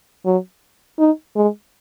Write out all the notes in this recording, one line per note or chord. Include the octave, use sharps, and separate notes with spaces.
F#3
D#4
G#3